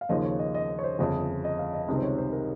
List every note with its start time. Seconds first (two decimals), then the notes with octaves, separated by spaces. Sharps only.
0.01 F5
0.09 D#2 C#3 F3 A#3 D#5
0.24 C#5
0.39 D#5
0.54 D#5
0.79 C#5
0.84 C5
0.99 G1 F2 C#3
1.44 D#5
1.59 F5
1.73 D#5
1.88 C#2 C3 D#3 G3 C4 D#5
1.97 C5
2.03 C#5
2.18 C5
2.33 A#4